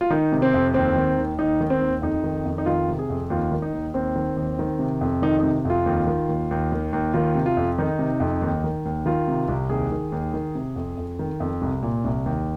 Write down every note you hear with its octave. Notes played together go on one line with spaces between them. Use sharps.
F4
D#3 D#4
C3
C4
F2
D#2 C4
D#3
D#2
D#2 D#4
D#3
C4
D#2
F2 D#4
D#3
F2
D#4
D#3 F4
C3
G#4
F2
D#2 F4
D#3
D#4
D#2
D#2 C4
D#3
D#2
D#3
C3
F2
D#3 D#4
C3 D#4
F2 F4
D#2
D#3
D#2
D#2
D#3
D#2
D#3 F4
C3
F4
F2
D#3 D#4
C3
F2
D#2
D#3
D#2
D#3 F4
C3
C2
D#2 G#4
D#3
D#2
D#3
C3
F2
F2
D#3
F2
C2
A#2
C2
D#2